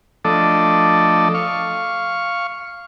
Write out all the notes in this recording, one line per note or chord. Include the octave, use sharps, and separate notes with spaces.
F3 A3 D4 A4 D5 D#5
F5 C#6